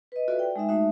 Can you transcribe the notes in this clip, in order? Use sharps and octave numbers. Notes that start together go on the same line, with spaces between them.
B4 D#5
F4 F#4 A4 B4 D5 E5
G5
G#3 D#4 E5
G#3 A3 D#4 F#4 E5